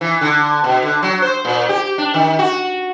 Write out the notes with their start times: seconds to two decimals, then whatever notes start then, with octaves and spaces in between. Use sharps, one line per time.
0.01 E3
0.21 D3
0.64 B2
0.82 D3
1.03 F#3
1.22 C5
1.45 A#2
1.69 G4
1.98 D4
2.14 D#3
2.39 F#4